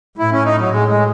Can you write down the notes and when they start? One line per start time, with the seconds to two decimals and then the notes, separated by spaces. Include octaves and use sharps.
0.18 A2 E4
0.32 C#4
0.45 D#4
0.58 F#3
0.71 A2 G#3
0.88 G#3